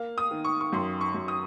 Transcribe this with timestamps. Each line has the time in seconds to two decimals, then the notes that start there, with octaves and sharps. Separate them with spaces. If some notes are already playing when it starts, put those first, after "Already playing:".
Already playing: A#3 F5
0.18 D#6
0.31 D#3
0.44 C#6
0.61 C#6
0.73 F#2 C6
1.01 C#6
1.14 F#2
1.28 D#6